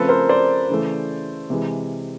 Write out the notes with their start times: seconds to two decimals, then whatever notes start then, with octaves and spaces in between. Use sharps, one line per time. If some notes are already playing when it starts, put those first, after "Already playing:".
Already playing: C#3 F3 A3 C4 A4 B4
0.09 A#4 C5
0.29 C5 D5
0.69 C#3 E3 A3
1.50 C3 E3 G#3